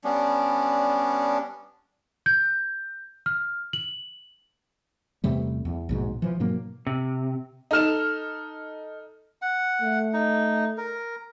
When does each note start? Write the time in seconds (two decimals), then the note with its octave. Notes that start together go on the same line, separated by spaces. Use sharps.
0.04 G3 B3 C#4 D4
2.26 G6
3.26 F6
3.73 F#7
5.24 E2 C3 G3 A3
5.65 E2
5.89 A#1 G#2 B2
6.22 E3 F3
6.40 G#2 B2 F#3 A#3
6.87 C3
7.71 D#4 A4 F6 E7
9.42 F#5
9.82 A3
10.13 D#4
10.78 A#4